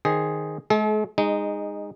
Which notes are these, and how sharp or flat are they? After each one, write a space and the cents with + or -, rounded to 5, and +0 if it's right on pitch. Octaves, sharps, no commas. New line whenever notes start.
D#3 +0 G#4 +0 C5 +10
G#3 +45 A4 -45
G#3 -20 D#4 +0